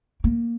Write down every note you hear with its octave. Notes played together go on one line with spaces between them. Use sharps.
A#3